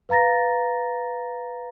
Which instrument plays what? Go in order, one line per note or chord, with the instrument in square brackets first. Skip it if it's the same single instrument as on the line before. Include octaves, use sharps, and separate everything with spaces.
[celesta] B4 F5 A#5 A6 A#6